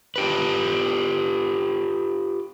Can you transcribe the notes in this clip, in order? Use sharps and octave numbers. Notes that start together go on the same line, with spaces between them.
F4 G4 B4